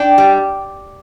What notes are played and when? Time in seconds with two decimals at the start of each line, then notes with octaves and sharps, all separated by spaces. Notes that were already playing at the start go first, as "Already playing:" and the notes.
Already playing: D4 G5
0.18 G3